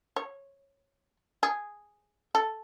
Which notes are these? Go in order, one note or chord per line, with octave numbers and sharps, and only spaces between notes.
C#5
G#4
A4